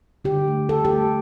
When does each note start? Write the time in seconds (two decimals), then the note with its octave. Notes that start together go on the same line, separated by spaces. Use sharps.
0.25 D3 G4
0.48 A3
0.69 D3 A4
0.85 G4
0.92 A3